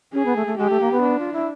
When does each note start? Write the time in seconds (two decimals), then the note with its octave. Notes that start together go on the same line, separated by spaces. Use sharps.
0.13 C#4 G#4
0.25 B3
0.36 A3
0.46 A3
0.58 G#3 G4
0.70 A3
0.81 A#3
0.92 B3
1.03 D4
1.19 F4
1.33 E4